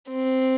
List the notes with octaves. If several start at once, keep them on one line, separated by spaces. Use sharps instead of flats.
C4